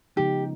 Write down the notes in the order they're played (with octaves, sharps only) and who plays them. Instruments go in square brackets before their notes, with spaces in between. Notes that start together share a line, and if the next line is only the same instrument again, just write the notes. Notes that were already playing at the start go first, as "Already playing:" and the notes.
[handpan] C#3 F3 G#3 B3 D#4 [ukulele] G4